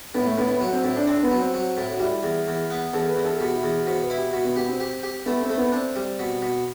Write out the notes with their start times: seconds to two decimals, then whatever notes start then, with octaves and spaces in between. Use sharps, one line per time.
0.15 A2 B3
0.26 A3
0.38 A2 B3
0.49 B3
0.61 F#3
0.72 C4
0.84 A2 C4
0.96 D4
1.07 C4 D4
1.23 B3
1.31 F#3
1.39 C4
1.54 F#3
1.77 A2
1.93 F#4
2.00 G3 E4
2.23 E2
2.48 E2
2.70 B3
2.93 E2 A4
3.09 B4
3.16 E2
3.24 A4
3.40 B2 G4
3.55 E4
3.63 E2
3.71 F#4
3.87 B2 C5
4.02 B4
4.10 E4
4.17 G4
4.33 B2 F#4
4.45 B3
4.56 B3 G4
4.68 C4
4.80 G4
5.03 G4
5.26 A3 B3
5.42 C4
5.50 A3
5.57 B3
5.72 C4 D4
5.96 G3
6.19 B2
6.42 B2